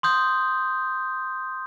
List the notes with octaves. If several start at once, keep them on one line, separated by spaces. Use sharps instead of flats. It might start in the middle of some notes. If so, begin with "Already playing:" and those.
C6 D#6 G6